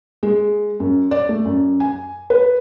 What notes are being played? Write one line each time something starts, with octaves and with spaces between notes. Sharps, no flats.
G#3
F#2
D5
A3
F#2
G#5
B4